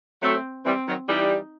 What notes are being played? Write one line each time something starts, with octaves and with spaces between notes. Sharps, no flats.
F#3 A3 C4
E3 G3 C4
D#3 F#3
E3 G3 D#4